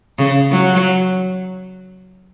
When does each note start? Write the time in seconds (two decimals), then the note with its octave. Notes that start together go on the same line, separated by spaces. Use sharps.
0.19 C#3
0.51 F#3